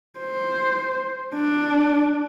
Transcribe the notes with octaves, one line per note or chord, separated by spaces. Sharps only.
C5
D4